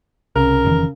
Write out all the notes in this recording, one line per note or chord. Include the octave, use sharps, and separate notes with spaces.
C2 C#3 A#4
F1 D#3 E3